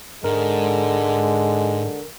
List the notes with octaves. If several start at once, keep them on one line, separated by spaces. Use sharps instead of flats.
G#2 D3 G#3 A#4